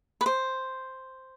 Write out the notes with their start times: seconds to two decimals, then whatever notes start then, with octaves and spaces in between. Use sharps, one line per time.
0.21 B4
0.26 C5